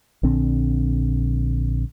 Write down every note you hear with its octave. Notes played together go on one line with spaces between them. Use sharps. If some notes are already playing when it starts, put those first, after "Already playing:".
A#1 D3 C4